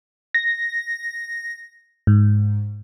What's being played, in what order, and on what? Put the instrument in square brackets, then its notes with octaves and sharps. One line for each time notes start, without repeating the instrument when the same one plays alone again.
[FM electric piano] A#6
G#2